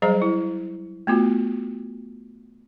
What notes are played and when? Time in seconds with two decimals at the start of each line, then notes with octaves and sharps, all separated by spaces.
0.02 F#3 G3 G#4 C5 D#5 A#5
0.22 E4
1.07 A3 B3 F4 F#4